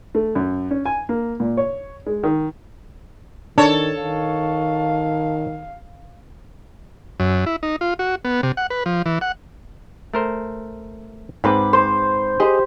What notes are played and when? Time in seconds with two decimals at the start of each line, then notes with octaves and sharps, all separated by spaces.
0.15 A3
0.35 F#2
0.71 C#4
0.86 G#5
1.09 A#3
1.40 A#2
1.57 C#5
2.06 G#3
2.23 D#3
3.58 D#3 D4 A4 C#5
4.02 D#3 F5
7.20 F#2
7.46 E4
7.63 D#4
7.81 F4
7.99 F#4
8.25 B3
8.43 C3
8.57 F#5
8.70 B4
8.86 F3
9.06 E3
9.21 F#5
10.14 A3 A#4 C5
11.44 G#2 C4 B4 B5 D6
11.73 C5
12.40 G4 G#4 C5 D#5